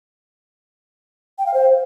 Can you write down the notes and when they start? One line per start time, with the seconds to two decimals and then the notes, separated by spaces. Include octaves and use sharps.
1.38 G5
1.46 F5
1.54 C5